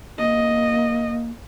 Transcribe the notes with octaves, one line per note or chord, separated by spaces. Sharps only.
A#3 D#5